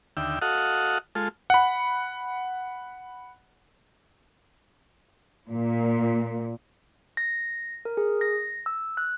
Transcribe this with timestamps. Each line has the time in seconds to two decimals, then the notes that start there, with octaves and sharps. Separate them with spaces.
0.17 D#2 D3 E5 G5
0.42 F#4 A4 D#5 F5 F#5
1.15 G#3 F4 A4
1.50 F#5 B5
5.49 A#2
7.17 A#6
7.85 A#4
7.97 G#4
8.21 A#6
8.66 E6
8.97 F#6